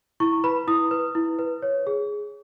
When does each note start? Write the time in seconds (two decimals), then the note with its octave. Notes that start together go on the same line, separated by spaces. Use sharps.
0.20 E4 C#6
0.44 B4 B5
0.67 E4 D#6
0.91 B4
1.15 E4
1.39 B4
1.62 C#5
1.87 G#4